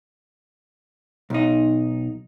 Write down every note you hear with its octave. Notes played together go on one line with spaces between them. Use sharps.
B1 D#4